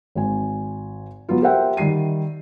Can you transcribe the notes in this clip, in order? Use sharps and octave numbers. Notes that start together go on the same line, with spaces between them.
G#1 G#5
F#3 B3 F4
G4 A#4 C5 E5 F#5 G5
D#3 G3 C7 D#7